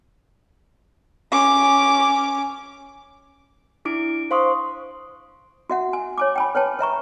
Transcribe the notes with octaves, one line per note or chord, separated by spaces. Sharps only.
C#4 D6
D4 E4 D6 D7
C5 F5 C6 C#6 D#6
F#4 E5 F#5
G#5
C#5 G#5 D6
G5 G#5 B5
B4 C#5 G5 A5
B4 E5 A#5 C#6